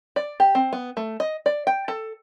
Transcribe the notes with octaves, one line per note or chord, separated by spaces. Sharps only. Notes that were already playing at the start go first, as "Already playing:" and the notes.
D5
G4
C4
B3
A3
D#5
D5
G5
A4